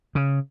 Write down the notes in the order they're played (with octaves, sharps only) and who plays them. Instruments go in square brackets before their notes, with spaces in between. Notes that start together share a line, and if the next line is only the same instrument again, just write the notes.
[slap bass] C#3